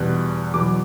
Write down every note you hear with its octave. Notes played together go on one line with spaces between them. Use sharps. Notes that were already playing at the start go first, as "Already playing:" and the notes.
Already playing: E2 B2 G3 D4 F#6
E2 B2 F#3 B3 D6